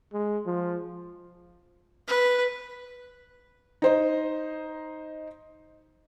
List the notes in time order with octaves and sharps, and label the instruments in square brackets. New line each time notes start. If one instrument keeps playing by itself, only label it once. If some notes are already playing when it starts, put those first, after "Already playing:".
[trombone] G#3
F3
[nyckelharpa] B4
[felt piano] D#4 C5 D#5